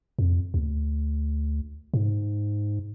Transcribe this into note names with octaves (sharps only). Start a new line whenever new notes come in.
F2
D2
G#2